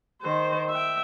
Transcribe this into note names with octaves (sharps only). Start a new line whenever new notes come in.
D#3 C5
E5 G5